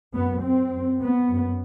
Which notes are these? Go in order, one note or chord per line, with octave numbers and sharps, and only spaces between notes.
F#2 B3
C4
F#2
B3
F#2